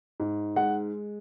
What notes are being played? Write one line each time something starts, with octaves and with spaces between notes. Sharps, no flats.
G#2
G#3 F#5